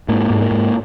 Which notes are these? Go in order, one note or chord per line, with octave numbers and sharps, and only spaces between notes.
G#2 A#3
G#2
A#3
G#2